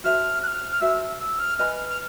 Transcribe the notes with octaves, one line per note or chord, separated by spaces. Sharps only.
F#4 A4 C5 E5 F6
F#6
F6
F6
F#4 A4 C5 E5 E6
E6
F6
B4 D#5 G#5 B5 F6
F6